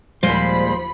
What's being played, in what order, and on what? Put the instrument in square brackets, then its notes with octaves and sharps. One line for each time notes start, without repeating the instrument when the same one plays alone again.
[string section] D#2 F3 B5 [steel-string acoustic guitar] A#2 G3 G#3 [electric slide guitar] C5